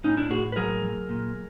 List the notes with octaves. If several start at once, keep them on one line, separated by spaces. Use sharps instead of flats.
A2 C#4 D#4
D4 E4
A2 F#4 G#4
B4
F#3 G#4 A#4
F#3
A#2